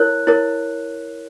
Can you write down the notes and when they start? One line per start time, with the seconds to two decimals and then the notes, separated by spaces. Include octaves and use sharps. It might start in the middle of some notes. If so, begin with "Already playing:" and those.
Already playing: E4 A#4 C#5 F#6
0.27 E4 A#4 C#5